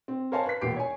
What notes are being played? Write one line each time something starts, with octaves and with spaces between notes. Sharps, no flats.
C4
A#4 C5 C#5 F5 G#5 A5
B4 B6
E1 A#2 B3 G4 C7 D7
C#5 G#5